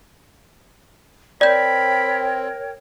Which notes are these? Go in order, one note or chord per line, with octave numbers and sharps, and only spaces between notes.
C4 A#4 C#5 D5 G5 B5 G6